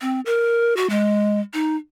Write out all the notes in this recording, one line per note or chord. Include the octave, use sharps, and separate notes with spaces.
C4
A#4
F#4
G#3
D#4